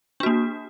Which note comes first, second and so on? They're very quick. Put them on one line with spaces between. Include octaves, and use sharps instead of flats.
D4 F#4 A#3